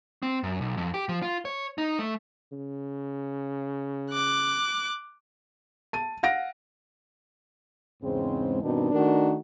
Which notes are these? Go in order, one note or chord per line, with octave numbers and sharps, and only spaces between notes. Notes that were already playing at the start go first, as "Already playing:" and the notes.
C4
F#2
B1
F2
G4
F3
F4
C#5
D#4
A3
C#3
D6 F#6
A5 D#7
F5 F#5 A#6 D7
E2 G#2 C#3 G#3 C4
G2 B2 D#3 C4 D4 D#4
D#3 A3 D4 D#4 F#4 A#4